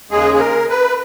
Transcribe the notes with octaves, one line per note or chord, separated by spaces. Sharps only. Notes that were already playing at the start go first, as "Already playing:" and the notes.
D#2 C#3 G#3 G#4
G#4
A#4
B4